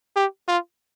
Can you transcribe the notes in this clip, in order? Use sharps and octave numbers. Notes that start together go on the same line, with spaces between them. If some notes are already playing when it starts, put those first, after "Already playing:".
G4
F4